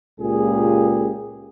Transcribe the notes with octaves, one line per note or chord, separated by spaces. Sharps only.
C#2 A#2 C#3 G4 G#4